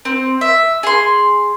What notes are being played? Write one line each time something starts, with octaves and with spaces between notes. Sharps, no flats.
C4
E5
G#4 C6